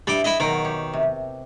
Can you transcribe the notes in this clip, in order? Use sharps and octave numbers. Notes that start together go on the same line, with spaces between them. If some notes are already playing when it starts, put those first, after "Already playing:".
G2 G3 E4 D6
E4 G#4 D#5
B2 D#3 F#3 A#4
G4 C#5
C3